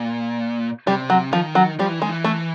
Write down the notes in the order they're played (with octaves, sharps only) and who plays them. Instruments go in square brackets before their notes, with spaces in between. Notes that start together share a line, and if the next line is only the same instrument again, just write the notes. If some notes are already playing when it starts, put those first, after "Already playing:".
Already playing: [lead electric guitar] A#2
[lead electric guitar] C3 [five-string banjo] G3
[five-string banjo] F#3
[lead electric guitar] D#3 [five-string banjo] F3
[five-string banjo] F#3
[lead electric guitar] F3 [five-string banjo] G3
[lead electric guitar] E3
[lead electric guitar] D#3 [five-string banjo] G#3
[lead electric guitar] E3
[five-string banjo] A3